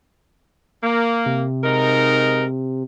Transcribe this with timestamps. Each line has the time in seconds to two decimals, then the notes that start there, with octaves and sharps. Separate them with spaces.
0.83 A#3
1.26 C3
1.63 G#2 D#4 A#4